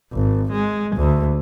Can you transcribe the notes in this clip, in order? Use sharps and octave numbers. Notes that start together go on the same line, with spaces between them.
G#1
G#3
D2